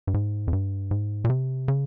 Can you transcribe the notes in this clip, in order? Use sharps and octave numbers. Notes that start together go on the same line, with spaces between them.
G2
G#2
F2
G2
G#2
A#2
C3
C#3